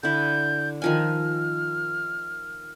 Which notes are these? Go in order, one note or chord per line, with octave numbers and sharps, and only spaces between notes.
D3 E4 G6
D#3 F3 G#5 F6